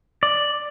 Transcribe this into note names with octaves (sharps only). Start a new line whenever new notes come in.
D5